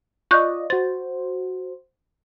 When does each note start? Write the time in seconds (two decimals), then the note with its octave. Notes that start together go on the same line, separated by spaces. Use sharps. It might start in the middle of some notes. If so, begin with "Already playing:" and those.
0.31 F4 D5 D#5 C#6 F#6 G6
0.70 F#4 C5 A6